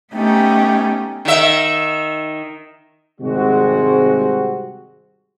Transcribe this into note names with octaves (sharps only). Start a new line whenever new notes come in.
A3 B3 C#4 D#4 G4
D#3 E5
G#1 C3 G3 G#3 C4 F#4